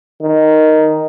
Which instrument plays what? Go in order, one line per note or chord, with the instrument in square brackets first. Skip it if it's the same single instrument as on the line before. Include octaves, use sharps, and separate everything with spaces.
[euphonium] D#3